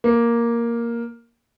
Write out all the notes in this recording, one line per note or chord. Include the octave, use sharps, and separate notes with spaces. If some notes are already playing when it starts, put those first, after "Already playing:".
A#3